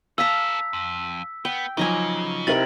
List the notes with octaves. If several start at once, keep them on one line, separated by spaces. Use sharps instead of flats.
C#4 A4 F5 A5 A#5 E6 B6
F2
B3 G5
C#3 F3 F#3 D#4 G#5 A#5 D6
C3 D#4 E4 A#4 A6 F#7